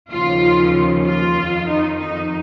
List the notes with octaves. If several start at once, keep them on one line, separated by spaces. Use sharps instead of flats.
D#2 C#3 F3 F4
F4
F2 D#3
D#4
D#4